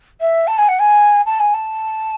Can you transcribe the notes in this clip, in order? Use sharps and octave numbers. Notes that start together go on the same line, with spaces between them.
E5
A5
G#5
F#5
G#5
A5
G#5
A5